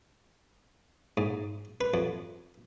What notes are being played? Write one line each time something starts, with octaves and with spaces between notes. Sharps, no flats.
G#2
B4
F2